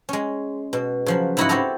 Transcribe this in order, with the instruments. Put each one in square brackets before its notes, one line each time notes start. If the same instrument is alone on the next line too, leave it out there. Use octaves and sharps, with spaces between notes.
[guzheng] G#3 C#4
B2
C#3 F3 F#3
G#2 C#3 E4 F#4 D#5 F#5
C4 E4 F#4 G4 A4 A#5